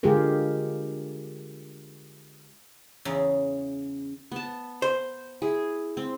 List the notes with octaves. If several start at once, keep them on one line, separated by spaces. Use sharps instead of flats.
D3 G#3 F4 G4 G#4 A#4
E2 C#3 A#5
B3 A5
C5
E4 G#4
C4